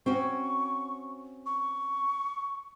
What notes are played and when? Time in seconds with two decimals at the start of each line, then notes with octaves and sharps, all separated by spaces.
0.06 C4 C#4 F#4 C#6
1.46 C#6